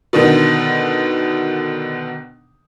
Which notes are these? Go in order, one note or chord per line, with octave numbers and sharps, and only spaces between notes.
B2 D3 D#3